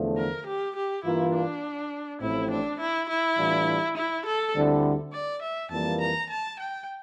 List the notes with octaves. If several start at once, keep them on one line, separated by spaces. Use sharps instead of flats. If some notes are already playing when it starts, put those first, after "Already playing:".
Already playing: E2 D3 F3 A3
A#4
G4
G4
G2 E3 A#3 E4 F4
D4
A1 A2 F3 C4 E4
D4
E4
E4
A2 E3 G3 D4 F4
E4
A4
D2 D3 G3 C4 E4
D5
E5
F2 E3 G3 A#3 A5
A#5
A5
G5